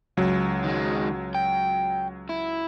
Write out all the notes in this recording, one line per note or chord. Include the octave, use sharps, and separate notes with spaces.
C#2 F#3
D#3 G#3
G5
E4